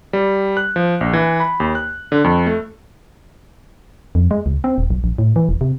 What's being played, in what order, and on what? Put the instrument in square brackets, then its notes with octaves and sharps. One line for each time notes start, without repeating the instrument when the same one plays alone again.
[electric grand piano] G3
F#6
F3
A#1
E3
B5
D#2
F#6
D3
F2
A3
[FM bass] F2
G#3
C#2
C4
D#1
B1
A#1
A2
E3
E1
C3